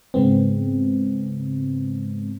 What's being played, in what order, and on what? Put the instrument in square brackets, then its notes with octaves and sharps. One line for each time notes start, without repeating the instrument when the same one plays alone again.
[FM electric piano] G#2 C#3 G#3 B3 C4